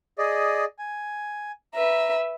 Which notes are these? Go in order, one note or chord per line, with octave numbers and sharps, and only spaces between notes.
G#4 D5 D#5
G#5
B4 E5 A#5